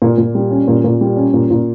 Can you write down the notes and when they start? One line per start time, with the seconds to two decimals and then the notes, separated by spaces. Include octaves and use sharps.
0.02 A#2
0.18 A#2
0.35 G3
0.51 C#4
0.68 A#2
0.84 A#2
1.01 G3
1.17 C#4
1.34 A#2
1.50 A#2